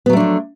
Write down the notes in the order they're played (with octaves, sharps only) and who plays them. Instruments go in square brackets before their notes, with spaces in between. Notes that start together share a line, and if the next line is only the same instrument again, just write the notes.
[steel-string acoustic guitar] B3
F#3
A3
D4
F3